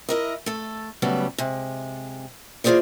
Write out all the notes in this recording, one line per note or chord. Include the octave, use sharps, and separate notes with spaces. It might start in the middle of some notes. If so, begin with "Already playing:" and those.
E4 A#4 D#5
A3 A4
C#3 F#3 G3 A3 B3
C3 G#3
E3 A#3 F4 G#4 C5 D5